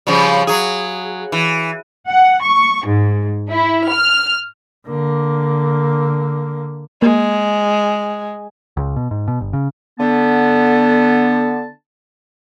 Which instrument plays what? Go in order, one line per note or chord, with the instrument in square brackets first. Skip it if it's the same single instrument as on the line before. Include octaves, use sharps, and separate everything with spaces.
[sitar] C#3 F3 G3
F#3 G#4
E3
[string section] F#5
C#6
G#2
E4
F6
[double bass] D3 A#3
[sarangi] G#3 [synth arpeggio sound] A#3
[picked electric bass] C#2
B2
G#2
B2
G1
C#3
[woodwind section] D3 B3 A5